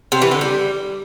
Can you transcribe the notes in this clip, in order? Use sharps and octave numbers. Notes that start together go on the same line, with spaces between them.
C3
E3
D3
G3